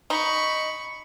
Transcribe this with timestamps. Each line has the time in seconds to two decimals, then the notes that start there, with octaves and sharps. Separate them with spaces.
0.10 D#4 B5 C#6